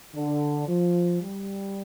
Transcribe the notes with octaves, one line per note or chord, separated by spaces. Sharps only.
D3
F3
G3